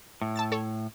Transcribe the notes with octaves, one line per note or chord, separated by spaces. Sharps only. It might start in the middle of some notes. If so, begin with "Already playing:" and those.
A2
A5 E6 A6
A4 C#5